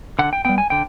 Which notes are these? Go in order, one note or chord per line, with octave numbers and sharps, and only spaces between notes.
D3 F#5
G5
G3 B3 G5
G#5
D3 G5